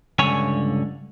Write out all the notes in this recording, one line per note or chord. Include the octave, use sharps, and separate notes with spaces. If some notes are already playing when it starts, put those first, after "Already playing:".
C#2 G2 D3 C#5 G#5